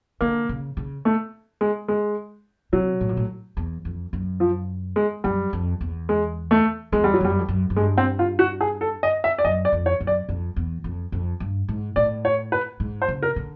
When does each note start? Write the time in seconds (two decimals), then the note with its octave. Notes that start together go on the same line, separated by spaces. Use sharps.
0.21 D3 A#3
0.49 C#3
0.77 C#3
1.05 A3
1.61 G#3
1.88 G#3
2.73 C3 F#3
3.01 A2
3.09 A#2
3.17 A2
3.57 E2
3.85 F2
4.13 F#2
4.40 F3
4.96 G#3
5.24 F#2 G3
5.53 F2
5.81 E2
6.09 G#3
6.51 A3
6.92 E2 G#3
7.04 G3
7.14 F#3
7.21 F2
7.25 F#2 G3
7.39 F2
7.48 F#2
7.70 F#2
7.76 G2 G#3
7.98 C4
8.19 F4
8.39 F#4
8.61 G#4
8.81 A4
9.03 D#5
9.24 E5
9.38 D5
9.44 F#2 D#5
9.65 D5
9.73 F2
9.86 C#5
10.01 F#2
10.07 D5
10.29 F2
10.56 E2
10.84 F2
11.12 F2
11.40 G2
11.69 G#2
11.96 A2 D5
12.25 C#5
12.52 B4
12.80 G#2
13.02 C5
13.08 C#3
13.23 A#4
13.36 D3